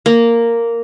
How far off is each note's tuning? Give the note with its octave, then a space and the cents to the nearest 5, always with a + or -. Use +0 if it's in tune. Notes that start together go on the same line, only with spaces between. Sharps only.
A#3 -5